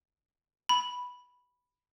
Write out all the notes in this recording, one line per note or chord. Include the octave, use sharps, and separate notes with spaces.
B5